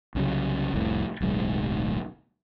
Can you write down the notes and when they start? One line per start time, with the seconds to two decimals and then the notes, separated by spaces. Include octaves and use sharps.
0.15 C2 C#3 F#3
0.74 F1 C2 A2
1.21 D1 B1 G#3